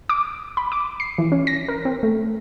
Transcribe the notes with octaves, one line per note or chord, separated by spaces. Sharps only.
D6
B5
D6
C7
E3
C#4
A#6
A#4
C4
A3